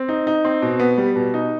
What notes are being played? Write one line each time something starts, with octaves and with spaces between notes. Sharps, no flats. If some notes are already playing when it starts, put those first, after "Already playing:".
Already playing: C4
D#4
D#4
C4
B2
B3
G3
B2
D#4